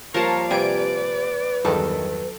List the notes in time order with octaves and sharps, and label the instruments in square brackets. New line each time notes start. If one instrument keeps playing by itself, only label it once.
[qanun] F3 G3 A#3 [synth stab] A#4 A5 [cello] C#5 F5
[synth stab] C3 G3 D7 [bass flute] B4 [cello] D5 [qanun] G#5
[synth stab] E2 G2 D#3 [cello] F#3 [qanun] A4